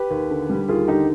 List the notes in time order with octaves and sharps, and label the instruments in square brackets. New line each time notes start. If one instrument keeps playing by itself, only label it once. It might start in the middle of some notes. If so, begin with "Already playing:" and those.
Already playing: [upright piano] G4 B4
D#2
D3
G3
D#2 F4 G#4
D3 D#4 G4